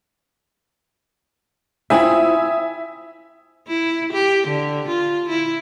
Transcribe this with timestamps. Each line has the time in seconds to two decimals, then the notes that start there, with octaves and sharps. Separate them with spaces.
1.90 C4 E4 F4 E5 G#5 D#6
3.68 E4
4.13 G4
4.48 D3
4.88 F4
5.29 E4